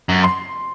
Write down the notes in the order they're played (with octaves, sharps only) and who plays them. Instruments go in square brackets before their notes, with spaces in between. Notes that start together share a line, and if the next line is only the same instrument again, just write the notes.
[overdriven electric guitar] F#2
[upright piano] C6